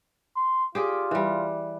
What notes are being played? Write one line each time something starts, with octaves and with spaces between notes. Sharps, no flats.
C6
F4 G4 G#4 D5
E3 G3